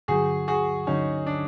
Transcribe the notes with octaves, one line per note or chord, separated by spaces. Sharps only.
G2 D3 F#3 F#4 G#4
F#4 G#4
G2 D3 F#3 C#4 D#4
D4